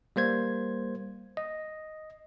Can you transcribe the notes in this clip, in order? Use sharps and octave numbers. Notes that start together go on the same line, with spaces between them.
G3 A#3 C5 G#6
D#5